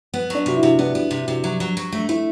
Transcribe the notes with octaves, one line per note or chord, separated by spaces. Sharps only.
B3
F#3 D4
C3 F#4
E4
C3
B3 D4
B3
C3
C3
F#3
F#3
F#3
A3
A3 E4